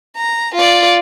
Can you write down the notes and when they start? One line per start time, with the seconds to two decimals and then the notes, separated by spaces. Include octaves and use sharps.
0.17 A#5
0.55 F4 D5